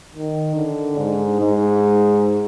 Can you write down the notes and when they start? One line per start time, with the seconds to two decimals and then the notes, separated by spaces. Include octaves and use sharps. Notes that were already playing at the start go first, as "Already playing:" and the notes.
0.15 D#3
0.56 D3
0.98 G#2
1.40 G#2